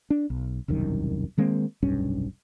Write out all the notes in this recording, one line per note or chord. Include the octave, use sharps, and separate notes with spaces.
D4
B1
E1 C2 F#2 D#3
D#3 G#3 A#3 C4
F1 B1 G2 C#4